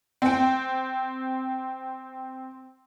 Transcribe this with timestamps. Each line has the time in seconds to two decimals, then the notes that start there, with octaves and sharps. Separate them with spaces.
0.22 C4 G5